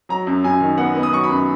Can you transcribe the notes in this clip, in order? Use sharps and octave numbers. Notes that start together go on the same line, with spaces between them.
F#3 A#5
F#2
F#2 G#5
D#3
B3 F#5
B3
D#6
F#3 C#6
B5
F#2